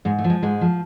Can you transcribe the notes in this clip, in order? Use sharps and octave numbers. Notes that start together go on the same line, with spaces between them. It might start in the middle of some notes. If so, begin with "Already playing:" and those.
G#2 G#3
A3
F3
G#3
G#2 G#3
F3